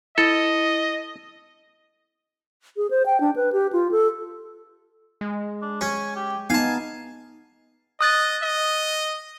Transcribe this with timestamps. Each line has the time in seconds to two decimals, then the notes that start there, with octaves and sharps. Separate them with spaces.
0.18 E4 A4 D#5
2.77 G#4
2.90 C5
3.06 G5
3.20 D4
3.36 B4
3.52 G4
3.73 F4
3.91 A4
5.21 G#3
5.62 D4
5.81 C#4 G#5
6.16 G4
6.50 B3 D#4 F5 G#5 A5
8.01 D#5 D#6 F#6 A6
8.43 D#5